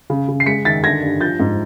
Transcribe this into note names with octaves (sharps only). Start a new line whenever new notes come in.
C#3
C#3
C7
G#3 B6 C#7
D#3 A6 B6
D3 G#6 A#6
G2
F3 G6 A6
G#2